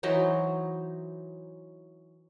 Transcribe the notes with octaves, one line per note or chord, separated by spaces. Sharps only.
E3 F#3 D#4 C5